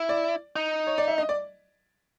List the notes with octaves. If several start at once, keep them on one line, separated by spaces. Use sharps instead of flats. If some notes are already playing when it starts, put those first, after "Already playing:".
Already playing: E4
D5
D#4
C#5
D5
E5
D#5
D5